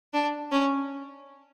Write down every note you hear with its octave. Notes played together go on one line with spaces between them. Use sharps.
D4
C#4